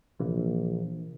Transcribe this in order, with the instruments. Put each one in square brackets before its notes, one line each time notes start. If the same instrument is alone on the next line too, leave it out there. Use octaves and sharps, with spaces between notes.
[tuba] A#1 [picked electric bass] C3 E3 A#3